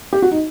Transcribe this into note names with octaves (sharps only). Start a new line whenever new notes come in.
G4
F#4
D#4